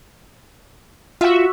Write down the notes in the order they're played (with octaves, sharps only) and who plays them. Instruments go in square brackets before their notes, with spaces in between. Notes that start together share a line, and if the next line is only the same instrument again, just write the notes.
[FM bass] F4 [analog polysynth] F#4 E5